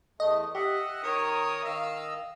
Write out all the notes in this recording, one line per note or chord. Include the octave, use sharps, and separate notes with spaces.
E2 A3 D#5
G4 D#5 E5 F#5
D#3 A#4 C#5 D#6
D#3 D#5 F5 E6